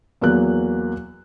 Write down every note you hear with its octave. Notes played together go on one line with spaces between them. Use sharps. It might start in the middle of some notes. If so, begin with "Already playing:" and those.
E2 F#3 A#3 F#6